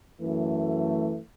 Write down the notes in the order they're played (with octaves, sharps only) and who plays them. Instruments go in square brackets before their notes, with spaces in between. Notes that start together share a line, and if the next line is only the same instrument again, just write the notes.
[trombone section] F#2 E3 A3